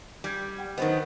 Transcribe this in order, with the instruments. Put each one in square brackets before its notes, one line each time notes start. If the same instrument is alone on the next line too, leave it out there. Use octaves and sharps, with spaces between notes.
[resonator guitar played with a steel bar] G3 [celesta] G#6 B6
[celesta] G4 F#5 G5
[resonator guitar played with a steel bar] D#3 F#3 B3 [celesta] D#4 C5 D#5